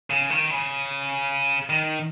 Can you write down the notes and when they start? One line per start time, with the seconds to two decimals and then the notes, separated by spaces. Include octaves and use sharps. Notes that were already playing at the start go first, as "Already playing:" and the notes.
0.10 C#3
0.30 D#3
0.50 C#3
1.70 D#3